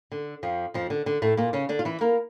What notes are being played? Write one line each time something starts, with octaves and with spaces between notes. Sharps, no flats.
D3
F2 F3
F2 F3
D3
D3
A2 A3
A#2 A#3
C#3 C#4
D3 D4
F4
E3 E4
A#3 A#4